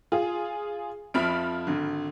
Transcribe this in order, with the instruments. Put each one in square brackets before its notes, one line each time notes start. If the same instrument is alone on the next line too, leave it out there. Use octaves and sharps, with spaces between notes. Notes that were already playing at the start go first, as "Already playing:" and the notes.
[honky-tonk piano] F4 G#4
[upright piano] F2 F3 E5 [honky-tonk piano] B5 F6 D7
[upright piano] G#1 D3